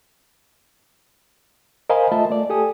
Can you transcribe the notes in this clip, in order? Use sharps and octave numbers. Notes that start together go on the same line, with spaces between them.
A#4 C5 D#5 F5 G#5 B5
A3 F4 D#5 E5 A5
A3 D5
G4 A4 G#5 D#6